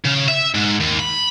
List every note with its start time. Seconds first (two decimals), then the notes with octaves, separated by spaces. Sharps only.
0.05 C#3
0.28 E5
0.55 G#2
0.80 D#2
0.99 B5